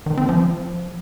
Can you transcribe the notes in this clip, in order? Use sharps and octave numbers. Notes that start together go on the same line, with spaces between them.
D#3
C4
F3